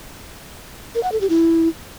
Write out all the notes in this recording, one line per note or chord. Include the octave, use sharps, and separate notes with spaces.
A#4
F#5
A4
G4
E4